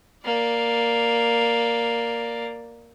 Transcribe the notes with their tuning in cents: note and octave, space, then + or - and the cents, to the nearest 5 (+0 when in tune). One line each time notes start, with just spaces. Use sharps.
A#3 +0 D5 +0